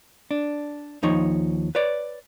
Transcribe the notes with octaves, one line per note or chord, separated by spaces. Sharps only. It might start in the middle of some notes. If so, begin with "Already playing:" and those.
D4
D#2 F3 D#4 C#5
B4 C#5 D5